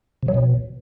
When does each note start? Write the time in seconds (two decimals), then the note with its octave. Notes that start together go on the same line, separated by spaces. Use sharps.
0.23 C3
0.28 F#3
0.34 B2